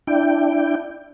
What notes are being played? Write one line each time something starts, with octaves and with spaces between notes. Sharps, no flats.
D4 E4 G5